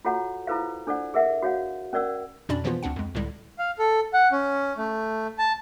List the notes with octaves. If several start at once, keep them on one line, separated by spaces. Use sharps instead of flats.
F4 F#4 A4 C#5 F#5 A#5
E4 F4 A4 B4 C5 F5
D4 A4 C5 D5 F#5
G#4 A#4 E5 F#5
F#4 C#5 F5 F#5
C#4 A#4 D5 F#5 E6
F2 B2 C#4 D4 D5 B5
B2 E3 F3 A#3 B3 F4
D2 C4 D4 F#5
F2 G#3
C#2 A2 D3 G3 G#3
F5
A4
F#5
C#4
A3
A5